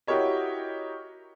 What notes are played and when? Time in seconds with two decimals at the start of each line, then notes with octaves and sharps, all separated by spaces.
0.07 E4 F#4 G4 A#4 C#5 D#5